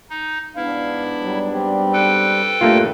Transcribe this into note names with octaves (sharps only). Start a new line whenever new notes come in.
D#4
G#2 B3 D4 E4 F5
F#3 G3
G3 C4 G4
A4 B4 G5
G2 A#2 A3 A#3 F4